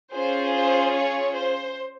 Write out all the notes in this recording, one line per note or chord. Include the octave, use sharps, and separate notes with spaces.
C#4 F4 G#4 C5
C5
C#5
C5